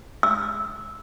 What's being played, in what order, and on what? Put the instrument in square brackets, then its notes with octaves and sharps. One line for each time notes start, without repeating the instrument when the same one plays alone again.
[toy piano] E6